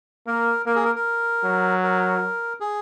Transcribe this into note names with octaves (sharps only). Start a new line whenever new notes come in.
A#3 A#4
A#3 A#4
G#4
A#4
A#4
F#3
A#4
G#4